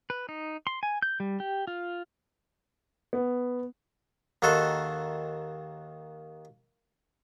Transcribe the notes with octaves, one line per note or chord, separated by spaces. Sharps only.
B4
D#4
C6
G#5
G6
G3
G4
F4
B3
D#2 D#3 F#4 A4 C6